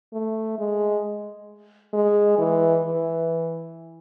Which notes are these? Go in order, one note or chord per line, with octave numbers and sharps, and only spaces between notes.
A3
G#3
G#3
E3
E3